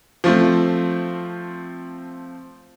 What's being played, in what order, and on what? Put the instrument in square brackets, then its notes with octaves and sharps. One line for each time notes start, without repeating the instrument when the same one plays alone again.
[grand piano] F3 A3 C4